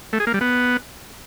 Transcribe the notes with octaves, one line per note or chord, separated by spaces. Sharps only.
A3
G#4
A#3
G3
B3